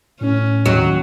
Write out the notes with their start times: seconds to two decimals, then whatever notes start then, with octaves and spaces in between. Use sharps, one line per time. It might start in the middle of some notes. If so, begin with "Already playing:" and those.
0.21 A2 C#4
0.66 D#2 D#3 F#3